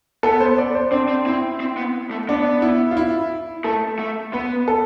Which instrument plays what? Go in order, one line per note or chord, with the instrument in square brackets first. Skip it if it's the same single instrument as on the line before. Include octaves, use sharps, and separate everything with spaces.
[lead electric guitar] B3 [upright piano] A4
[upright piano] C5
D5
C5
[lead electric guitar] C4 [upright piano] D4
[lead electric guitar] C4
[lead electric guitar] C4 [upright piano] E4
[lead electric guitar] C4
B3
A3
[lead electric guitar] B3 [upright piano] D4
[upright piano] E4
F4
E4
[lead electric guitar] A3 [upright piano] A4
[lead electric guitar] A3
[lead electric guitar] B3 [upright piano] B4
[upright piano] A4